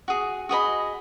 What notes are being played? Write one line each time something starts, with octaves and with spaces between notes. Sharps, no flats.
F#4 G#4
F#4 G#4 D#5 B5